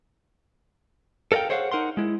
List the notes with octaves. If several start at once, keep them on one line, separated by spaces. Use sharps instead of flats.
A4 A#4 D5 F5 G5
G#4 C5 C#5 D#5 F5 F#5
D#4 A#4 F#5 C6
G#3 E4